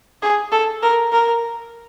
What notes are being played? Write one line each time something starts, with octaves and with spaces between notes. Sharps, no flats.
G#4
A4
A#4
A#4